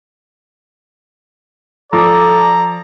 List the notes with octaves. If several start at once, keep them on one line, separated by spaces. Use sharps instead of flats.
F3 A4 D5 A#5